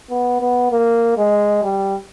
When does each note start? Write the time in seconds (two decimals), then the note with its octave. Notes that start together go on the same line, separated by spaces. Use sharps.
0.10 B3
0.41 B3
0.71 A#3
1.17 G#3
1.63 G3